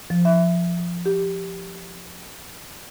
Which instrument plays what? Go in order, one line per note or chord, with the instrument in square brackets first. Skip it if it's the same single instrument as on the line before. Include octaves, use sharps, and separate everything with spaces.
[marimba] F3
E5
G4